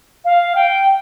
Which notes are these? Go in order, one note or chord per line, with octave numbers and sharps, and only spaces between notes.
F5
G5